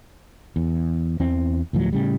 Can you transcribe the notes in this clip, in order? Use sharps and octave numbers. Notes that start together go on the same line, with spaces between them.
E2
E2 E3 C4
D2 A2 F3 F#3
A2 C#3 G3